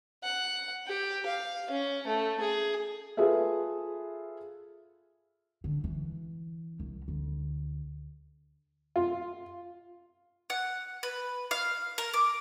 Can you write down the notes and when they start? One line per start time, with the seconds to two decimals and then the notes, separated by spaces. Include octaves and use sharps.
0.23 F#5
0.87 G4
1.26 F5
1.71 C#4
2.07 A3
2.40 G#4
3.17 F4 G#4 A4 B4 E5
5.64 D3
5.84 E3
6.80 C2
7.08 D2
8.96 F4
10.50 F#5
11.03 B4
11.51 F5
11.98 A#4
12.14 D6